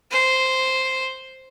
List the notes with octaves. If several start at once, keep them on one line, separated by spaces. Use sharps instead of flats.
C5